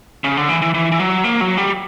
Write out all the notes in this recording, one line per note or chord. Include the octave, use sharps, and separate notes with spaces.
C#3
D3
E3
E3
E3
E3
F#3
A#3
F#3
G3